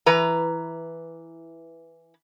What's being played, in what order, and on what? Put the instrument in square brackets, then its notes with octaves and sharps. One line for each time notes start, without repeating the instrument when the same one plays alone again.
[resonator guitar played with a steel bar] E3 B4 A#5